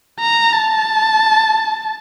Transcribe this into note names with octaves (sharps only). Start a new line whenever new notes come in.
A#5
A5